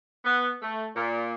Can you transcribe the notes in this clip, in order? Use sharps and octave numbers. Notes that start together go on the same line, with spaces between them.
B3
A3
A#2